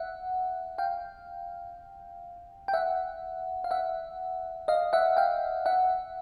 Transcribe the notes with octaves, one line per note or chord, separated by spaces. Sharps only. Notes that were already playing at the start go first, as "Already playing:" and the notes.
Already playing: E5 F#5
F5 G5
G5
E5 F#5
F5
E5 F#5
D#5 F5
E5 F#5
F5 G5
E5 F#5